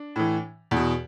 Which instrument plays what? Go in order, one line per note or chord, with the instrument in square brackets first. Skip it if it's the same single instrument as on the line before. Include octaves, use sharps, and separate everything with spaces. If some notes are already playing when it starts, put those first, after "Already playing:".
Already playing: [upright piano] D4
A2 E3
E2
B2